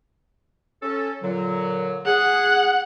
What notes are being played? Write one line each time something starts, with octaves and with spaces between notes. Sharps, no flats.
C#4 A4
A#2 D3 F#3
G#4 F#5